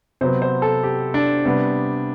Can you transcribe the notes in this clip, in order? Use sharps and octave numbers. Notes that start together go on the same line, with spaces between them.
C3 F#3 B3 C5
C5
A4
G4
D4
C3 G3 B3